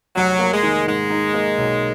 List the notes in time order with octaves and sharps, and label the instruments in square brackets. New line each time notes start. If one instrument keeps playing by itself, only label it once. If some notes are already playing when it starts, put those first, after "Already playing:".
[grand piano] F1 [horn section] F#3
[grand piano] A#3
[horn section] G#3
[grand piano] D#3
[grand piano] G#2 [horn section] G#3
[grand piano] D#4
A#3
B1